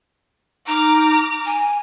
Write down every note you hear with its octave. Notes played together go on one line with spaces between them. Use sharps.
D#4 A#5 D6 F6
G#5